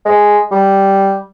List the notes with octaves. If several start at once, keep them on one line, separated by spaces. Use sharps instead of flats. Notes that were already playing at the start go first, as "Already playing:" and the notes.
G#3
G3